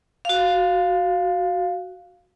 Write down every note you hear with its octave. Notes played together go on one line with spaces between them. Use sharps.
F#4 F5